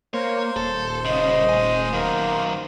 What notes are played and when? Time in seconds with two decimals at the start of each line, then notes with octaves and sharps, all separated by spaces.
0.14 A#3 C5 C#5
0.56 D#1 A4
1.05 C2 C#3 D#5
1.49 A3 G#5
1.93 F#2 D#3 A#3